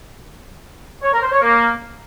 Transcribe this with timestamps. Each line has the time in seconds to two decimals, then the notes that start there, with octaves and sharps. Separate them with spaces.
1.03 C#5
1.13 A#4
1.22 C5
1.32 C#5
1.42 A#3